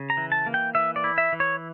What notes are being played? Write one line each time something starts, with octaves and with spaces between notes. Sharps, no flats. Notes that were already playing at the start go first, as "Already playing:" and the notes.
Already playing: C#3
A#5
E3
A5
A#3
G5
E3 E5
D5
E4
E5
E3
C#5